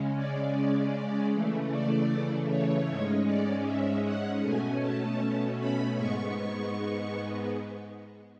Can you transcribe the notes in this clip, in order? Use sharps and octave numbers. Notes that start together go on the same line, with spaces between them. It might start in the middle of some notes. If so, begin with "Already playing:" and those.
Already playing: C#3 G#3 C#4
D5
C#3 E3 A3
D5
C#5
G#2 G#3 C#4
D5
E5
F#5
B2 A3 C#4 G#5
A5
B5
G#2 G#3 B3 C#6
C#6